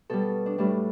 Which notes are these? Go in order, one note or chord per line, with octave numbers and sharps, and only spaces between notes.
B2 G3 A4
D4
A2 G3 D4